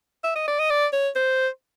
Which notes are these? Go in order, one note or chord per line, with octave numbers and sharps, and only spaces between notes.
E5
D#5
D5
D#5
D5
C#5
C5